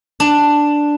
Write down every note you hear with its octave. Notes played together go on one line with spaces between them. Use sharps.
D4